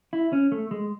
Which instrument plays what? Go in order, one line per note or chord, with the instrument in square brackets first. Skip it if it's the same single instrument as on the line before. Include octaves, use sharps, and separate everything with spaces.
[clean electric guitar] E4
C#4
A3
G#3